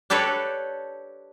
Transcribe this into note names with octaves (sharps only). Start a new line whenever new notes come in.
D4 G4 A4 B4 C#5